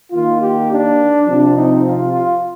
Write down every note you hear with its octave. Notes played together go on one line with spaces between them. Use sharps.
D#3 A#3 F4
G4
D4
C3 F3 C4 D4
D#4
F4
F4